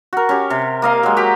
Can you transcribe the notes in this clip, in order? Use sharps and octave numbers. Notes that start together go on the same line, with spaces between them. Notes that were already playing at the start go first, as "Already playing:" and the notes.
F#4 A#4
C#4 G4
C3
A#3 D#5 F5
F#3 G#3
F#4 G4